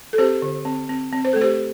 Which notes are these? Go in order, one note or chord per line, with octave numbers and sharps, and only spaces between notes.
A4
C4 G4 C5
D3
C4
C4
C4
C5
A3 A4
G4 C5